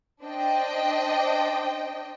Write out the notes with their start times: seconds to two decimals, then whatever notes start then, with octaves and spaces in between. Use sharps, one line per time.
0.23 D4 C5 D#5 G5